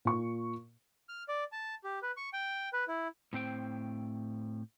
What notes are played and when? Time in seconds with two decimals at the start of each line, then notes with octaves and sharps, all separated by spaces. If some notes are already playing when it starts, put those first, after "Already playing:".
0.05 A#2 C#6
1.09 F6
1.28 D5
1.52 A5
1.84 G4
2.03 B4
2.17 C#6
2.33 G5
2.73 B4
2.88 E4
3.33 A2 C4 C5 G5